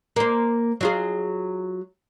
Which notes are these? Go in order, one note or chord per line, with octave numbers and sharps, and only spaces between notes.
A#3 C5
F#3 F4 G#4